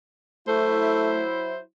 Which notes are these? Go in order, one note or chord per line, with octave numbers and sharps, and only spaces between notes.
F#3 A3 E4 C5